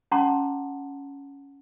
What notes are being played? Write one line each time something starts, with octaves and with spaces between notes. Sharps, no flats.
C#4 F#5 A5 A#5 C6 D6